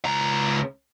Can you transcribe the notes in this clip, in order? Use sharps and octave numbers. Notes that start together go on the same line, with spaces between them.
C#2 A#5